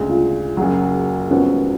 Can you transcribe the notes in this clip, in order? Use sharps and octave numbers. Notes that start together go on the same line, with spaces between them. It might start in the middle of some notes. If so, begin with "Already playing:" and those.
Already playing: D2 C#3 G#3 G#4
F4
F#1 F#2 C#3 F#3
G#1 G#2 F3 B3 C#4 F#4